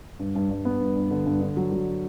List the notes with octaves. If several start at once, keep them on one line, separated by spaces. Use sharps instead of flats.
G2
G2
G2
B3
G2
G2
D3
G2
D3
F#3
F#3